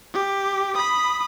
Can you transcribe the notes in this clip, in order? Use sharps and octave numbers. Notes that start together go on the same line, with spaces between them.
G4
B5 D#6